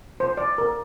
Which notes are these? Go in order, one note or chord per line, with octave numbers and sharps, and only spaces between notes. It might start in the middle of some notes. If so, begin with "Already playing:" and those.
C5
D5
A#4